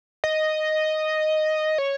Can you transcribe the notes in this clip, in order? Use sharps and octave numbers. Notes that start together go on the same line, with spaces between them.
D#5
C#5